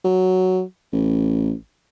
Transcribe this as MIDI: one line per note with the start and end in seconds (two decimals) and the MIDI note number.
0.04 0.62 54
0.93 1.52 33